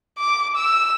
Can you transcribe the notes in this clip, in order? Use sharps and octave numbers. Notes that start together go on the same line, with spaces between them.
D6
E6